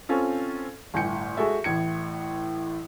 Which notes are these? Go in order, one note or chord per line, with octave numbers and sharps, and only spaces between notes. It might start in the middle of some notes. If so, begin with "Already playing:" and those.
C4 C#4 F4 A4
G1 A2 G#5 G6 C#7
G#3 F#4 A4 E5
A1 A2 G#6 C#7